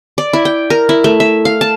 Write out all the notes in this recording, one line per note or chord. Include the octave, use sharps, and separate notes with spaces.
D5
E4
G5
A#4
E4
A3
E5
F5
A5